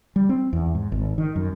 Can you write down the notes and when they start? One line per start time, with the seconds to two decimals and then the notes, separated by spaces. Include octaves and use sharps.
0.16 G3
0.29 C4
0.53 E2
0.75 G#2
0.92 G#1
1.18 D#3
1.36 F#2